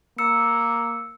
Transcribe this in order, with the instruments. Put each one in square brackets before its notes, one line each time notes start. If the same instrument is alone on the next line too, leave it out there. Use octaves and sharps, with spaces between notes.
[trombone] A#3 [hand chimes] E6 C#7